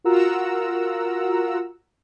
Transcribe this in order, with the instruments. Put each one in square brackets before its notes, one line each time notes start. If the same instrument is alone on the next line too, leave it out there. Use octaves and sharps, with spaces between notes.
[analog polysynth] F4 F#4 A#4 F#5 A#5 E6